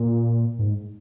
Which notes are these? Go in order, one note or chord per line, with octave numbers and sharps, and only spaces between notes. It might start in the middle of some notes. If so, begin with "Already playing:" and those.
Already playing: A#2
G#2